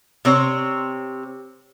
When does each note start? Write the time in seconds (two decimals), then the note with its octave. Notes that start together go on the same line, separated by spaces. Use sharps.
0.25 C3 C4 C#5